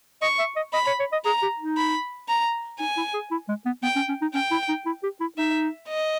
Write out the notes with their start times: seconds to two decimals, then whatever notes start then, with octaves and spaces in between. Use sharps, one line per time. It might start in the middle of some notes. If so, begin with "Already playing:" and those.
0.22 D#5 C#6
0.39 E5
0.56 D#5
0.73 D#5 B5
0.87 C#5
1.00 C#5
1.12 D#5
1.25 G#4 A#5
1.42 G4
1.59 D#4
1.77 B5
2.28 A#5
2.80 D#4 G#5
2.97 E4
3.14 G#4
3.31 E4
3.49 G#3
3.66 B3
3.83 B3 G5
3.96 C#4
4.09 C#4
4.21 D#4
4.34 C#4 G5
4.51 E4
4.69 D#4
4.86 E4
5.03 G4
5.21 E4
5.38 D#4 E5
5.88 D#5